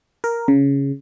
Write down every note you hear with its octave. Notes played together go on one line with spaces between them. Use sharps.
A#4
C#3